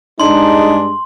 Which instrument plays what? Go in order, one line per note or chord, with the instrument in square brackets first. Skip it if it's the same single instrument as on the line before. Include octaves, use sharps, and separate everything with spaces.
[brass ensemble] G2 G#3 [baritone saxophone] D4 [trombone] D#4 [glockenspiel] C6